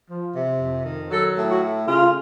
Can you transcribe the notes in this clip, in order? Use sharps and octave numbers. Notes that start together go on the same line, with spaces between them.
F3
C3
F2
D#3
F#3 A4
A2
F#4
A3
C#3 F4